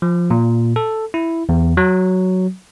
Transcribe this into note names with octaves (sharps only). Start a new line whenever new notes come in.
F3
A#2
A4
E4
E2
F#3